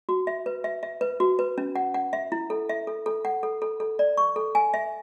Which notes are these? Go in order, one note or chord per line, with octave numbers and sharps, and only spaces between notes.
F#4
E5
B4
E5
E5
B4
F#4
B4
C#4
F#5
F#5
E5
E4
A4
E5
A4
A4
F#5
A4
A4
A4
D5
C#6
A4
G#5
E5